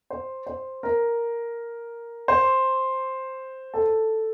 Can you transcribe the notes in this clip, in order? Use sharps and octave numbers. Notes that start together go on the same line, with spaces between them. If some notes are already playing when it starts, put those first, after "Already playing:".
C5
C5
A#4
C5
A4